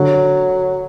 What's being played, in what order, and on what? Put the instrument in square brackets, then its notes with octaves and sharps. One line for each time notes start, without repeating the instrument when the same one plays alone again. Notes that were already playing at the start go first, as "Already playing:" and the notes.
Already playing: [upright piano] D3 [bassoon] F#3